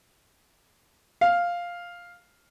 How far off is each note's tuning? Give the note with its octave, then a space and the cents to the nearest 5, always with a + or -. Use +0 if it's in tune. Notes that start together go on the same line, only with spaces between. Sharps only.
F5 +0